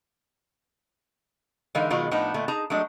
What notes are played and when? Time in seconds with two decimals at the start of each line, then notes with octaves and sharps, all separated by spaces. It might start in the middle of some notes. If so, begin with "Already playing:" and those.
1.75 D3 E3 G#3 D#4 A#4 F5
1.90 B2 D#3 F#3 G#3 F4 A#4
2.11 A2 F3 B3 D4 D#4 A#5
2.34 A#2 D3 A3
2.48 D#4 G#4 A5 A#5
2.70 F#3 G#3 A3 D4 D#5